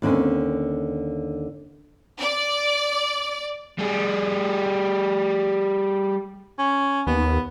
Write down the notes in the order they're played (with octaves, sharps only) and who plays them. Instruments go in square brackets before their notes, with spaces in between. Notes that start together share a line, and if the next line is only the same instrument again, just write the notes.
[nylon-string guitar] D#2 D3 C4 C#4
[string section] D5
[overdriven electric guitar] G3 G#4
[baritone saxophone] C#4
[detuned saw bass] D#2 [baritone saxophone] B3